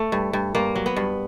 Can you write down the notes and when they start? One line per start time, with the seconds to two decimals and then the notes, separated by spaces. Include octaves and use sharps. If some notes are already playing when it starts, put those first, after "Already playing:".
Already playing: A3
0.12 G2
0.33 G2
0.55 G2 A#3
0.75 F#3
0.86 B3
0.96 G2